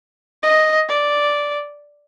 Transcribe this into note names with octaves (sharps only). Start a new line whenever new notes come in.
D#5
D5